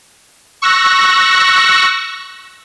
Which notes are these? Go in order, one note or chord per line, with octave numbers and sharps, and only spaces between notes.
C#6 E6 F#6 A#6